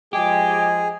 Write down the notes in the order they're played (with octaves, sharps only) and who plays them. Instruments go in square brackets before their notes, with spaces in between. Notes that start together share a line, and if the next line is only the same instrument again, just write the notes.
[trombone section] F3 G#3 [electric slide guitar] G4 [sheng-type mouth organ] G#4